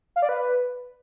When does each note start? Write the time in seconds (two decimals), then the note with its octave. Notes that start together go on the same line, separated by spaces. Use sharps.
0.16 F5
0.22 D5
0.29 B4